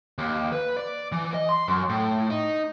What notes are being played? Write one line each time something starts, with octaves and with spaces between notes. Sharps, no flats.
D#2
B4
D5
E3
D#5
C6
F#2
A2
D#4